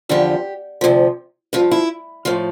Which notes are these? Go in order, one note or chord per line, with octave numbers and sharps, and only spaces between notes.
E2 D3 F3 G4
D2 C3 F3
G2 F3 F4
E4
A2 F3 F4